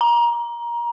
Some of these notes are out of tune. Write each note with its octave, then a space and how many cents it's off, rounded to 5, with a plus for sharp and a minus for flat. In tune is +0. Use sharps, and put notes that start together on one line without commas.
A#5 +20